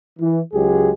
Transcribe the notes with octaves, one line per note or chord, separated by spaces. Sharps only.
E3
C#2 F#3 G#3 G4 G#4